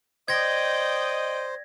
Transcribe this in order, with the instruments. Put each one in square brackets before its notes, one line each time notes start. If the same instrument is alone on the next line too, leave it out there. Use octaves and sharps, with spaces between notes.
[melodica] C5 [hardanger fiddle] D5 G5 [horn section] D#5 [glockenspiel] G#6 A#6